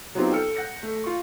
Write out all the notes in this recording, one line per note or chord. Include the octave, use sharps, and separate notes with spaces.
F#3 B3 C4 D#4 F4 G4
A4 G5 E6 F6 C#7
F#5 G6 A#6 C#7
A3
F4 C#6